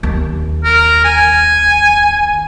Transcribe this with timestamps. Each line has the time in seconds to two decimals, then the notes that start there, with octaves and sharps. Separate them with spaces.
0.03 D#2
0.64 A#4
1.04 G#5